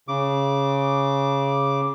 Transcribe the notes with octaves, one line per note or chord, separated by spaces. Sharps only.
C#3 D6